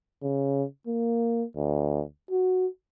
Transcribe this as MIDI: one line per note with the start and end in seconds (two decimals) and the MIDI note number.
0.22 0.64 49
0.87 1.44 58
1.57 2.02 38
2.31 2.67 66